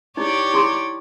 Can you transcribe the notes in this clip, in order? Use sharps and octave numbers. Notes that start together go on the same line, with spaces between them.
D#4 E4 G4 C#5 D5
E4 C6 D6